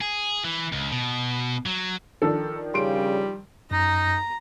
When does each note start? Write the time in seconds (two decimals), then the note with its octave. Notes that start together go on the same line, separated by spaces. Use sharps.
0.01 G#4
0.44 E3
0.72 C#2
0.91 B2
1.66 F#3
2.22 D#3 F3 D4 A4
2.74 C#3 G3 C6 D7
3.71 F#2 D#4 A#5